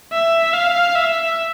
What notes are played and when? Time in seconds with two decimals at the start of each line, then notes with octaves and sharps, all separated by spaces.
0.13 E5
0.54 F5
0.95 E5